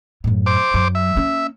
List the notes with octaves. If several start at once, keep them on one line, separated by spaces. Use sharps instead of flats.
F#2 A2
C5 D6
F#2 F#3
E5
A#3 C#4